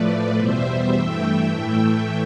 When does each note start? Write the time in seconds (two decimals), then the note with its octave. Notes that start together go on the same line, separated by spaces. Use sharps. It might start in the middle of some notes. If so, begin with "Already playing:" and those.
Already playing: A2 F3 A3 B4 D5
0.36 E2 B2 G3 C5 E5
0.64 C5 E5
0.92 G2 E3 A3 E5 G5
1.50 A2 E3 A3 E5 G5